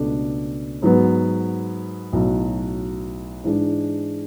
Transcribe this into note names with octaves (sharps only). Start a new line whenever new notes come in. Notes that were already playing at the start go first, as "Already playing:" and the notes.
Already playing: C#2 B2 A3 D4
G#2 F#3 B3
B1 A2 F#3
G#2 E3 G#3 D4